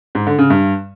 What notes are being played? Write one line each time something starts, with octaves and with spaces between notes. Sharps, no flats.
G#2
D3
C#3
G2